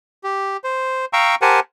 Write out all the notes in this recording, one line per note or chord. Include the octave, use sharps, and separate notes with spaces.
G4
C5
F5 G5 A#5 C#6 E6
G4 A#4 C5 F#5 G#5 A5